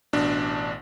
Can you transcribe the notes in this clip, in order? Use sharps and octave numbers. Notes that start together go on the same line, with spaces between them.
A1 B2 D4